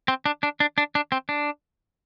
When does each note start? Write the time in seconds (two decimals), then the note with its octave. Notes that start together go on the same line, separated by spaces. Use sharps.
0.08 C4
0.26 D4
0.43 D4
0.60 D4
0.78 D4
0.95 D4
1.12 C4
1.29 D4